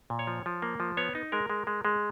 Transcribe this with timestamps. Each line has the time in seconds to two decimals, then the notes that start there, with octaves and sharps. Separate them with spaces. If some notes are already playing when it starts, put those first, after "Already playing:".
0.10 A#2
0.19 C#5
0.27 F3
0.46 F3
0.62 A#3
0.80 F3
0.97 B3 C#5
1.15 D#4
1.32 G#3 A#4
1.50 G#3
1.67 G#3
1.85 G#3